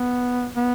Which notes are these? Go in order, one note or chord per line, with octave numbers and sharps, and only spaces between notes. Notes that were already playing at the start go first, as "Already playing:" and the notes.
Already playing: B3
B3